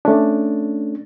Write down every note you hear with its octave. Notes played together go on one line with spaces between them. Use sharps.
A3 C#4 D4